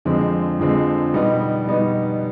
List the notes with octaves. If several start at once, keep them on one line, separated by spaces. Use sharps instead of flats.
F2 D3 F3 G#3 C4
F2 D3 F3 G#3 C4
B2 G3 B3 D#4
B2 G3 B3 D#4